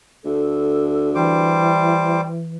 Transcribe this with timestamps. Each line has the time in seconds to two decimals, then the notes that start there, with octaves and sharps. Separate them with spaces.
0.24 D2 A4
1.15 E3 G3 C5 D6